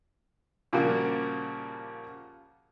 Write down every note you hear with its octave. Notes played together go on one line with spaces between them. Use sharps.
A#2 C#3 F3 G3 A#3 F#4